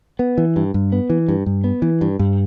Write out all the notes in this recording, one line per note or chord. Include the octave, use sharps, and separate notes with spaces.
B3
E3
G2
G2
B3
E3
G2
G2
B3
E3
G2
G2